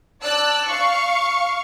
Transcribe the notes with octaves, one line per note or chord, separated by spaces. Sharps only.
D5 A5 E6 F#6
F5 C#6